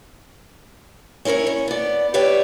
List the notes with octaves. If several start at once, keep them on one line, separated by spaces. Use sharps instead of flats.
C#4 E4 A#4 C5 C#5
C#4
B3 D5
G4 B4 C#5 D5 E5 G5